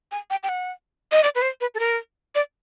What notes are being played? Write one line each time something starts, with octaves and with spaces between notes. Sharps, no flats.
G#5
G5
G5
F#5
D#5
D5
B4
C5
B4
A4
A#4
D5